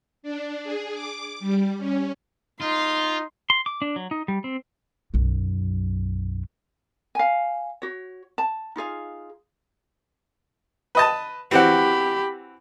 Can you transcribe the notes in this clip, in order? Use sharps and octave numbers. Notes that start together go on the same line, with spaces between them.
D4
G#4
D6
G3
C#4
D#4 F4 C6
C6
D6
D4
F#3
D#4
G3
C4
B1 F#2
F5 G#5
F#4 C#5
A5
D#4 F4 G#4 F5
B4 D#5 A5
E3 C4 F#4 G4 B5